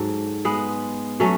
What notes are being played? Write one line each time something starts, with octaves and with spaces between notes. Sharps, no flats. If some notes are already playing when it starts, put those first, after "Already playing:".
Already playing: G#2 F#3 A4
G#3 B3
F#3 A3 C#4